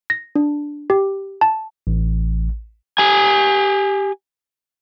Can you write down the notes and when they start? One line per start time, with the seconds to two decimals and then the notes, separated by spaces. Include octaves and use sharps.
0.10 A#6
0.36 D4
0.90 G4
1.41 A5
1.87 A1
2.98 G4 G#5